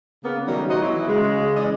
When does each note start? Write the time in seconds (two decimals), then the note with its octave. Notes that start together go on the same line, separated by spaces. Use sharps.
0.25 C#3 A#3 B3
0.47 D#3 F#3 G3 A3 C#4 D#4
0.69 B2 B3 D#4 F#4 C5 D#5
0.82 E3 F#3 E4
1.08 C#3 G#3
1.56 E3 C#4 D5 D#5